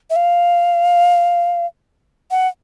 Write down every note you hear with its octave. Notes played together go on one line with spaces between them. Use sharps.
E5
F5
F#5